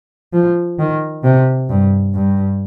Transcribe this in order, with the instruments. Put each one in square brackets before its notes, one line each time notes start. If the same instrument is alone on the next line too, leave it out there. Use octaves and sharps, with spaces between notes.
[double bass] F3
D#3
C3
G2
G2